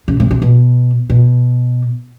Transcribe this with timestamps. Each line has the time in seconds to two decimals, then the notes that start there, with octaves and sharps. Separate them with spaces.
0.08 C#3
0.20 C3
0.31 C3
0.42 B2
1.10 B2